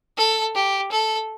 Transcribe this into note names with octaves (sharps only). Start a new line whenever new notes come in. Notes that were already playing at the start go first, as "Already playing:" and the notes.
A4
G4
A4